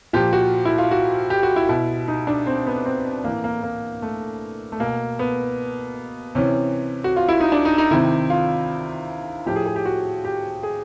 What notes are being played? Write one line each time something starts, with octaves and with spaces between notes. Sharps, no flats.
A#2 F3 G4
F#4
E4
F4
F#4
G4
F#4
E4
B2 E4
D#4
D4
C4
B3
C4
A2 E3 A#3
A#3
A#3
A3
A3
B2 A#3
B3
C3 E3 C#4
F#4
F4
E4
D#4
D4
D#4
D#4
C3 D#3 E4
F4
A2 F3 G4
G#4
G#4
G4
F#4
G4
G#4